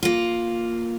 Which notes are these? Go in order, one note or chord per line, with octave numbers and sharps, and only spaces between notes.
A#3 F4